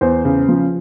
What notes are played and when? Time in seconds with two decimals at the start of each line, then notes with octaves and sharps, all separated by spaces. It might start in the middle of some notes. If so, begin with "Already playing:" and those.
0.01 E2 C5
0.25 C#3
0.48 F3